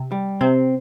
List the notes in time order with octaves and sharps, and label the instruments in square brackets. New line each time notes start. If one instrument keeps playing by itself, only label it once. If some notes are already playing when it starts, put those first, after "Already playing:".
Already playing: [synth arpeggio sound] C3
[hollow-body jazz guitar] G3
[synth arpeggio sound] C3 [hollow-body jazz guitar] C4